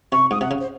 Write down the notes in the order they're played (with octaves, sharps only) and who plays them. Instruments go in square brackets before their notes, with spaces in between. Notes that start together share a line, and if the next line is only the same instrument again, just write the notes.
[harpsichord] C3 [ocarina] C#6
[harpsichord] G#2 [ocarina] D#6
[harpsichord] C3 [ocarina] F#5
[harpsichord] C#3
[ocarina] C5